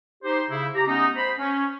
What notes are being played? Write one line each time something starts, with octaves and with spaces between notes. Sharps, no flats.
D#4 G4 C5
C#3 E4
G4 A#5
A3 B3 C#4 D#4
C5 B5
C#4